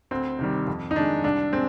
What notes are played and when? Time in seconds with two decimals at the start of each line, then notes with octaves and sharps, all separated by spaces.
0.11 D2 C4
0.39 C3 D#3 G3
0.67 F2
0.91 D#4
0.96 D#3 G#3 D4
1.24 C2 D4
1.52 G#3 C4